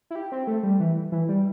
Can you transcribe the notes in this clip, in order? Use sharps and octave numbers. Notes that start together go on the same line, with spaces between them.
E4
G4
C4
A3
G3
E3
E3
G3